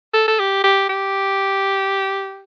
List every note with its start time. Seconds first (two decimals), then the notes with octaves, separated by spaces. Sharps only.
0.14 A4
0.28 A4
0.39 G4
0.64 G4
0.89 G4